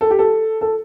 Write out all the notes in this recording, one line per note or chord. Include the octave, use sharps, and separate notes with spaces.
A4
G4
A4
A4